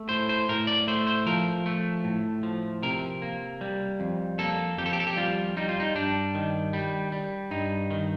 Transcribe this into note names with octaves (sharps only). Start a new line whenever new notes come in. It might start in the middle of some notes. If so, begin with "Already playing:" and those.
Already playing: A3
A2 C5
C5
A2 A#4
D5
A3 C5
C5
F3 A#4
A3
A2
F3
C3 A#4
A#3
G3
F2
A#3 A4
F2 G4
A4
G4
A4
G4
G3 F4
G3 D#4
F4
D#4
G2 D4
D#3
G3
G3
G2 D#4
D#3